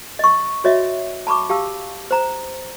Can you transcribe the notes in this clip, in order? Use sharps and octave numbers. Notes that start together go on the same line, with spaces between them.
D#5 C#6
F#4 C#5 D#5 E5
A5 B5 C#6 D6
G4 F5 A5 E6
C5 A#5